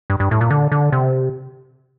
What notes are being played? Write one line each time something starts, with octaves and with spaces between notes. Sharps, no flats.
G2
G2
A2
A#2
D3
D3
C3